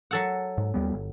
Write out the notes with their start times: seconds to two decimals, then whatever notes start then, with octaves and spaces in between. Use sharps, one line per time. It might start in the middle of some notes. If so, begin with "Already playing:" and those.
0.11 F#3 A4 F#5
0.58 G#2
0.74 D#2 G3 B3
0.94 G1